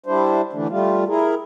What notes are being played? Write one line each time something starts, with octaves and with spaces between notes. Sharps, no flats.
G3 D4 E4 C5
D3 E3 A3 D4
G3 A3 F4
E4 G#4 A#4